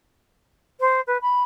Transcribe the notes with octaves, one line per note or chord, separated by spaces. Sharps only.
C5
B4
B5